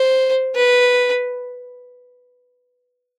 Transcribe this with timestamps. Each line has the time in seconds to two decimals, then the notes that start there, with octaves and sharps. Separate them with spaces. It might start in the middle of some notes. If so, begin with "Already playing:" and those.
Already playing: C5
0.56 B4